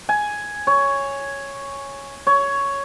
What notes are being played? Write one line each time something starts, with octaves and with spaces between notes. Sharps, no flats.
G#5
C#5
C#5